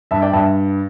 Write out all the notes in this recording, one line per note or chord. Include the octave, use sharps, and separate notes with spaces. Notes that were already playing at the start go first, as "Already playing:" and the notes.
G2 E5 A5
D5 G5
G2 E5 A5